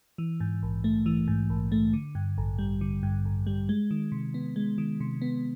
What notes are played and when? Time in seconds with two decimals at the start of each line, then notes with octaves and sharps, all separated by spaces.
0.18 E3
0.40 G#2
0.63 A#1
0.84 A3
1.06 E3
1.28 G#2
1.50 A#1
1.72 A3
1.93 D3
2.15 G2
2.38 A1
2.59 G3
2.81 D3
3.03 G2
3.25 A1
3.47 G3
3.69 G#3
3.91 D#3
4.12 C3
4.34 B3
4.56 G#3
4.78 D#3
5.00 C3
5.22 B3